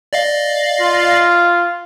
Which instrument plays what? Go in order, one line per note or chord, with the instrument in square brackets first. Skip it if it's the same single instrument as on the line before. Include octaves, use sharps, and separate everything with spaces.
[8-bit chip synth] D5 D#5 F5
[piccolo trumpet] F4